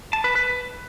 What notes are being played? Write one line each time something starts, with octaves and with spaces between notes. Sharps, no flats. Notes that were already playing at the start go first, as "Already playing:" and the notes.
A5
B4
B4